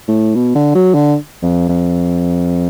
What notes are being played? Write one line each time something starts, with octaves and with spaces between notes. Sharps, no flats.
A2
B2
D3
F#3
D3
F2
F2